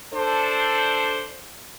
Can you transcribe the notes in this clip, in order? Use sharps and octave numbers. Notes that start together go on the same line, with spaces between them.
D4 A4 C5